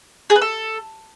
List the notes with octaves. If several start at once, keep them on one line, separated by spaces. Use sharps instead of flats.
G#4
B4
A4